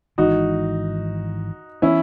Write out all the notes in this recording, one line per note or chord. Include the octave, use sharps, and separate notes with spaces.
G#1 G#2 E3 D#4 F#4
E3 B3 C#4 E4